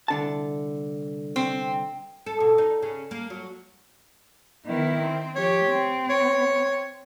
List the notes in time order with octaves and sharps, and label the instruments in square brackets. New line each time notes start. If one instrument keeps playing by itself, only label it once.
[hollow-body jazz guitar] C2 D3 A5
[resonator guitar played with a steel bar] C4
[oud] A4
B2
D#4
C#3
A#3
F#3
[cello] D#3 B3 [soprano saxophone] E4
[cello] C4
[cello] F3 G4 [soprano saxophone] C#5
[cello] C4
[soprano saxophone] C#5